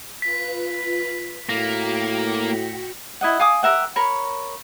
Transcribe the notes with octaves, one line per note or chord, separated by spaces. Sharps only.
F4 B4 B6
A2 A#3 F#4 G5 A#6 C#7 F7
E4 D#5 F#5
F5 G#5 D6 D#6
G4 A#4 E5 F#5
A#4 C#5 B5